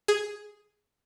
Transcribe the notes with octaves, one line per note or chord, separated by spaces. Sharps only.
G#4